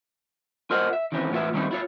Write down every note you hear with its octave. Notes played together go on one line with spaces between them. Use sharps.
F4 A#4 C5 D#5 F#5
E5
D#3 E3 C4 C#4 E4
E2 A2 B3 F4 E5
D#3 G3 C4 C#4 D#4 E4
E4 F4 C#5